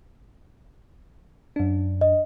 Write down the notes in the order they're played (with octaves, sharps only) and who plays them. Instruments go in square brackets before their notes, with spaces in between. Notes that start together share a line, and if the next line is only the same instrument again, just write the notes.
[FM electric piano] F#2 D4
[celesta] D#5